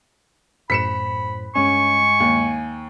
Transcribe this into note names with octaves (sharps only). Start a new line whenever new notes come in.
F#2 A2 C5 B5 B6 C#7 E7
G2 G#3 C#4 D#5 G#5 C#6
D#2